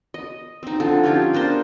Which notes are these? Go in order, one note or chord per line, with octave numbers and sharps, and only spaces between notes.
D#5
C4 D#4
D3 F3
C#4 D#4 F4 G4
B3 D4 A#4 C5